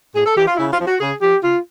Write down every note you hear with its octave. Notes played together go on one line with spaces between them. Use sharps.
A2 G#4
A4
E3 G4
F4
C#3 E4
F4
F3
F#4
C#3 G#4
F3 G4
C#3 F4